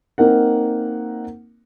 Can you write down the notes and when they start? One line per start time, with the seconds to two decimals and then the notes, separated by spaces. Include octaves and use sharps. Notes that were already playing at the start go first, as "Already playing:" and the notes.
0.18 A#3 C4 D#4 A#4 F#5